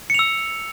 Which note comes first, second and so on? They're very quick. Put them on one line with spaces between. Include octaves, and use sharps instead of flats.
C#7 F7 E6